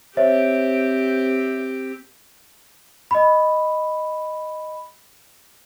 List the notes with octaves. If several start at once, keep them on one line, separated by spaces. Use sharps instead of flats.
C4 G4 C5 C#5 E5
D#5 B5